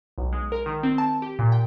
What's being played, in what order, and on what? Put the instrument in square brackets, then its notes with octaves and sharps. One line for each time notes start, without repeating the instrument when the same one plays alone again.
[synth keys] B1
G#3
A#4
D#3
C4
A5
G4
A#2
G5